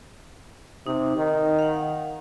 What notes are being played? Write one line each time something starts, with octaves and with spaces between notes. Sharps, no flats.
C3 D#4
D#3
F5 F#5